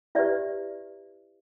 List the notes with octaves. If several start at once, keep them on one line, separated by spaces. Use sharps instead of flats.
E4 G4 B4 D5 E5